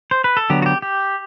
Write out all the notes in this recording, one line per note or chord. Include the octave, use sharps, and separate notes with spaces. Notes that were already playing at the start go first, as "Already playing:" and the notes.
C5
B4
A4
D3 F#3 B3 G4
F#4
G4
G4